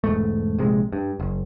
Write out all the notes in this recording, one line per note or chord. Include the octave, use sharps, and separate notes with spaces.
E1 G#2 A3
A#1 C3 G#3
G2
F#1